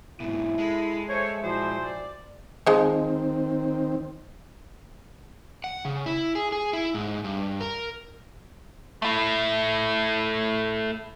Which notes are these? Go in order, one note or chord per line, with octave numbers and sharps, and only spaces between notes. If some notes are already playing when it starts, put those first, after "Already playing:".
G#2 B2 E4
G#3 A4 B5
A4 C5 C#5 E5
A#2 F3 E4 F#4 C5
D5
D#3 F3 G#3 C4
F#5
C#3
E4
G#4
G#4
E4
G#2
G2
A#4
A3 E4